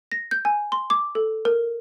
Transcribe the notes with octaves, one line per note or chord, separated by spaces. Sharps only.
A#6
G6
G#5
C6
D6
A4
A#4